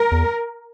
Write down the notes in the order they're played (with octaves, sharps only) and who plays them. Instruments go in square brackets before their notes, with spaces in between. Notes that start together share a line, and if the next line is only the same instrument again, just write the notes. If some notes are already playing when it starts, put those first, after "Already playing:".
Already playing: [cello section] A#4
[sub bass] E2